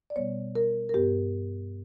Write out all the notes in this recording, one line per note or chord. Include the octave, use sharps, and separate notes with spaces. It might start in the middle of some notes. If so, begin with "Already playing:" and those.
D5
B2 G3 B3 C#5
A#4
A#4
G2 E3 B3 G4